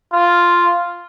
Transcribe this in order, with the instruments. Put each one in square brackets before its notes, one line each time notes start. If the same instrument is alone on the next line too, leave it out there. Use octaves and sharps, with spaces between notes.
[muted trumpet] F4